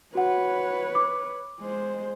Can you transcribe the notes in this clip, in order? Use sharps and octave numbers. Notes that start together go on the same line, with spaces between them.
F#4 B4 C#5 F#5
D6
G#3 C5